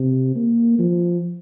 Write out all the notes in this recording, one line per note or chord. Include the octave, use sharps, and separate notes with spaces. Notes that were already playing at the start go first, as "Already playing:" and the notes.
Already playing: C3
A#3
F3